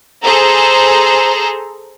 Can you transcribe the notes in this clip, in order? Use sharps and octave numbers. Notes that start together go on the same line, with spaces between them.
G#4 A4 C5 A#5